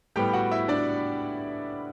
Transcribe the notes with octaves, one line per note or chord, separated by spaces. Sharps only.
A2 G3 B3 G4 G5
F#4 F#5
E4 E5
D4 D5